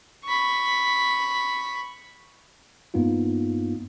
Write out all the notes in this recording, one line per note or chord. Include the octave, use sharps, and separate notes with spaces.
B5 C#6
G2 A#3 B3 D#4 F4